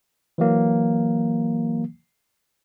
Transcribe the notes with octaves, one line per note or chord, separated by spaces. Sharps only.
E3 F#3 A#3